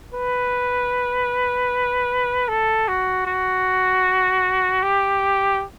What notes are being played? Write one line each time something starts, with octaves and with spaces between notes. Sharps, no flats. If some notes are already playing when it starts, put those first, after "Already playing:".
B4
A4
F#4
F#4
G4